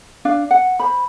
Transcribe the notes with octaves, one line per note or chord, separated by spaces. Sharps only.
D4 D5 F5
F#5
C5 B5